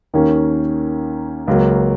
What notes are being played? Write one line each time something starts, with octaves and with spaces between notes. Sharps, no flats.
D#2 D#3 A#3 C#4
C#2 C#3 F#3 A#3